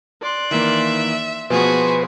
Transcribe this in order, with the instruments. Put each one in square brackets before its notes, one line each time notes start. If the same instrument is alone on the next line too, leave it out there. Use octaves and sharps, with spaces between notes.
[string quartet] D5 C6 F#6
[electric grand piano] D#3 E3 A#3 [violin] E5
[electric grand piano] B2 F3 [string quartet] B3 [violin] F#4 G#4 [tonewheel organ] B4 C6